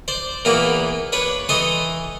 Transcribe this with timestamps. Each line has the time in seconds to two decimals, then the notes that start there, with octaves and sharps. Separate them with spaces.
0.08 C5 D5
0.45 E2 A#2 E3 A#3 E4 B5
1.12 D4 B4 C#5
1.49 E3 A4 D#5 C6 C#6 D#6